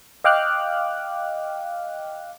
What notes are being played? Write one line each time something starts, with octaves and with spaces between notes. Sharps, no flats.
D#5 F5 G5 D6 F6 F#6